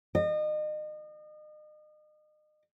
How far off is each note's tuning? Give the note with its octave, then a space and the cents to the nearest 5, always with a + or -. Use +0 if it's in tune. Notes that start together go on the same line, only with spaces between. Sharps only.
D#5 -35